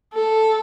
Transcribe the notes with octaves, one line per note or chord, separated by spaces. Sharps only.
A4